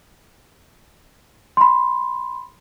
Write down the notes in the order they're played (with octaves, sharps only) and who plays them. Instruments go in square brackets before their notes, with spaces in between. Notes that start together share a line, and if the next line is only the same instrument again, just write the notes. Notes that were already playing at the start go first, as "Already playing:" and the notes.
[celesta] B5 C6